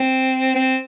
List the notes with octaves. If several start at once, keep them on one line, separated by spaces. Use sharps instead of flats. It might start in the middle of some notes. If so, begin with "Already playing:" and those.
Already playing: C4
C4